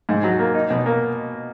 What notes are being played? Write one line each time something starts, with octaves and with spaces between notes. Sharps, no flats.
G#2
F#3
A#3
D#4
B2
A#3